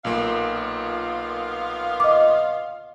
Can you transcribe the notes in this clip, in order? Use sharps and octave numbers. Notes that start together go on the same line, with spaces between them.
B1 A#2 A#3 B3 F4 F5
D#5 D6